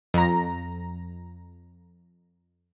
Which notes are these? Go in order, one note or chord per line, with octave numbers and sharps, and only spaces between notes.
F2 A#5